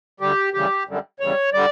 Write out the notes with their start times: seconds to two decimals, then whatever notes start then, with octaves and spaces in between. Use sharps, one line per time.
0.20 D2 D3 G3 G4
0.54 D2 C#3 E3 G3 G4
0.87 F#2 D3 G3
1.20 E2 C#3 G3 C#5
1.53 D3 G3 D5